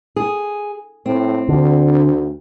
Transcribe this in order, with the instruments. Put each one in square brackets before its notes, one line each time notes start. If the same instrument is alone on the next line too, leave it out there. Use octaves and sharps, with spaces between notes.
[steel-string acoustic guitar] G#4
[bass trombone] A2 [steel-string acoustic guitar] C4
[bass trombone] D2 [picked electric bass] D3